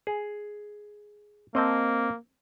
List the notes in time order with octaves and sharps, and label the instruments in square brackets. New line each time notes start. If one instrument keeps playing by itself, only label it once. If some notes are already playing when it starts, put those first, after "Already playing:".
[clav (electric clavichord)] G#4
[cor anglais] A#3 [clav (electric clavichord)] C4 D#5 A5